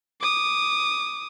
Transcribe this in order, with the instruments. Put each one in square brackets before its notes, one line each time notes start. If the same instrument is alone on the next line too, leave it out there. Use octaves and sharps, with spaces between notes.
[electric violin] D6 D#6